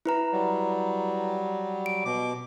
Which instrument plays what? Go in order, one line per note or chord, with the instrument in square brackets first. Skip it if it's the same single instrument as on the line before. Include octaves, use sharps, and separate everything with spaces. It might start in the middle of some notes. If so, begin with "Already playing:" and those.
[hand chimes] E4 B4 A#5
[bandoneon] F#3 G3
[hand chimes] D7
[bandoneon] B2 D6